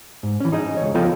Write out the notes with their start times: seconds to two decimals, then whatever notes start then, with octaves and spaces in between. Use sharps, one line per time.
0.23 G#2
0.40 E3 C#4
0.52 D#4 G#4 D#5
0.77 C#2 C#5
0.94 F3 B3 F4 A4 D#5 G5